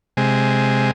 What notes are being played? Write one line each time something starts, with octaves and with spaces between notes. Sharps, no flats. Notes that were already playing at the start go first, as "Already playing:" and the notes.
C3 G#3